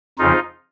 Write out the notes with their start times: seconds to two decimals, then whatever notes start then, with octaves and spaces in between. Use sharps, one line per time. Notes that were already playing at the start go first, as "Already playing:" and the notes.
0.19 F2 C#3 F3 D#4 F4